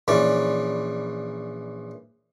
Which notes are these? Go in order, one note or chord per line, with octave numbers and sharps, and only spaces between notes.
A#1 E3 C#4 D5